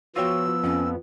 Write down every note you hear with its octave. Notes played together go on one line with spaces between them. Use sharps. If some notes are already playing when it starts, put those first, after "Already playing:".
F3 B3 F4 F#4 C#5 G5 E6
F2 C#4